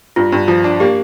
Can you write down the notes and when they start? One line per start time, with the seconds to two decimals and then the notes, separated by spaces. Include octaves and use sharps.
0.16 G2 F4
0.32 G2
0.48 F3 F4
0.64 D4
0.80 A#3 G4